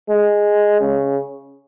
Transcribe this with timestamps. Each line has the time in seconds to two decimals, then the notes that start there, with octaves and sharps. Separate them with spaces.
0.09 G#3
0.80 C#3